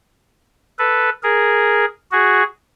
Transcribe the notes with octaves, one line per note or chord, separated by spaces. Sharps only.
A4 B4
G#4 A#4
F#4 G#4